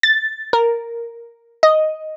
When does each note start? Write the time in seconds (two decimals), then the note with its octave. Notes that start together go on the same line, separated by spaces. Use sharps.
0.03 A6
0.53 A#4
1.63 D#5